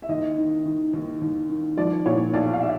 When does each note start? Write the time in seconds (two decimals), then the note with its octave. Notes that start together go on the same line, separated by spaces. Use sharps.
0.02 E5
0.09 D#2 D#5
0.38 D#3
0.66 D#3
0.93 D#2
1.21 D#2
1.49 D#3
1.77 F3 D5
2.06 A#2 C#5
2.33 B1 D5
2.53 F5
2.61 E5